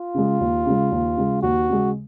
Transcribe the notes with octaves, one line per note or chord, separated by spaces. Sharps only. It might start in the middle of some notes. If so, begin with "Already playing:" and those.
Already playing: F4
C#3 G#3
D#2
C#3 G#3
D#2
C#3 G#3
D#2 F#4
C#3 G#3